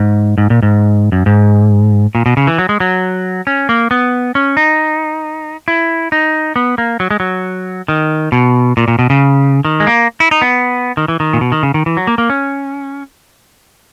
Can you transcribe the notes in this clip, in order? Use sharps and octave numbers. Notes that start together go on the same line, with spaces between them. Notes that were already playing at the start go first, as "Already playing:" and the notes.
Already playing: G#2
G#2
A#2
G#2
F#2
G#2
A#2
B2
C#3
E3
F#3
G#3
F#3
C#4
A#3
B3
C#4
D#4
E4
D#4
B3
A#3
F#3
G#3
F#3
D#3
B2
A#2
A#2
B2
C#3
D#3
G#3
A#3
E4
D#4
B3
D#3
E3
D#3
A#2
B2
D#3
C#3
D#3
E3
F#3
A#3
A#3
C#4